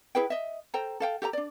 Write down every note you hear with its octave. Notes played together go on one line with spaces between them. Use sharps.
E4 G#4 B4 G5
D#5 E5
A4 C5 G5 A#5
A4 F5 G5
G4 A4 F#5 A#5
D4 D5